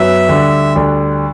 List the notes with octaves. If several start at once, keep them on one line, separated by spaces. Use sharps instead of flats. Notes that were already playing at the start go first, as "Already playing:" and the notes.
Already playing: F#2 F#3 B3 E5
D2 D3 G3 D4
D2 D3 G3 D4